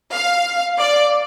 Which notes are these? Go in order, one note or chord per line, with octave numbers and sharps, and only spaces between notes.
F5
D5